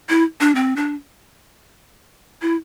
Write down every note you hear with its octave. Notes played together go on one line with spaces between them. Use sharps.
E4
D4
C4
D4
E4